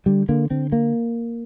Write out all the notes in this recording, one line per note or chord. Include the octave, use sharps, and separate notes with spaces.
D3 G3
D3 A#3
D3 C4
A#3